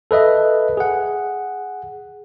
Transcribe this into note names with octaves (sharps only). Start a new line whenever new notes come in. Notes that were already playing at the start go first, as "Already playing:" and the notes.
A4 B4 D#5 E5
G#4 F#5